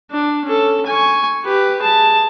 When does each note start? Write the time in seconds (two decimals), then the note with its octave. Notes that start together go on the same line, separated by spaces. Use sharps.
0.11 D4
0.45 C#4 A4
0.86 G#5 C#6
1.44 G4 B4
1.79 G#4 A5